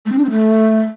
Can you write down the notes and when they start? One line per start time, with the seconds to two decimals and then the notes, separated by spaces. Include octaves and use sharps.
0.06 A3
0.12 C4
0.18 D4
0.24 C4
0.30 A3